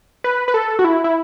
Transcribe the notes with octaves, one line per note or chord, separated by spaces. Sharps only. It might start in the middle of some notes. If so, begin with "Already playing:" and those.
B4
B4
A4
F#4
E4
E4